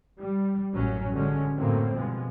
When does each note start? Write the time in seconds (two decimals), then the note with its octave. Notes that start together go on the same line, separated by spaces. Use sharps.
0.19 G3
0.74 A1 F#2 F#3 C#4
1.11 G2 D3 F#3 G#3 C#4
1.57 F#2 A2 D3 F#3 A#3 C4
1.95 G2 B2 F3 G#3